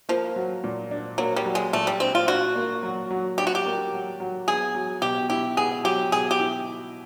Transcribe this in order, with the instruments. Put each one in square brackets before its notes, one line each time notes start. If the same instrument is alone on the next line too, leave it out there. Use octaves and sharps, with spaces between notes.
[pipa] F3 [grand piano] A#3
[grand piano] F#3
A#2
D4
[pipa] F#3 [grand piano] A#3
[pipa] G3
[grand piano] F#3
[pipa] G#3
[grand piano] A#2 [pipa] A3
[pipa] G3
[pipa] C4 [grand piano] D4
[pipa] F4
[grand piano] D4 [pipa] F#4
[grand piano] A#3
F#3
F#3
[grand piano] D4 [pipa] G4
[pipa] F#4
G4
[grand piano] A#3
F#3
F#3
[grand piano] B3 [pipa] G#4
[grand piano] F#3
[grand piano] B2 [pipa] G4
[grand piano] E4 [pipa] G4
[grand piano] B3 [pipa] G#4
[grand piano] F#3 [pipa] G4
[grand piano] B2 [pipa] G#4
[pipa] G4
[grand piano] E4